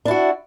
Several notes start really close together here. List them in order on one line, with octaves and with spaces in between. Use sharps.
D4 E4 F#4